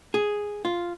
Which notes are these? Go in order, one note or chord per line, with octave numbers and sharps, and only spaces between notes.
G#4
F4